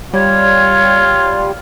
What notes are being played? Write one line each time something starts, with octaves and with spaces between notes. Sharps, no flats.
G3 F4 C#5